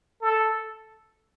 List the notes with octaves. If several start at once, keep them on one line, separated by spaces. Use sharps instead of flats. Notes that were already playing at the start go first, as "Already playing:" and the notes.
A4